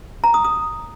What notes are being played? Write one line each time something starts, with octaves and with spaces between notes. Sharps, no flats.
A#5
D#6
D#6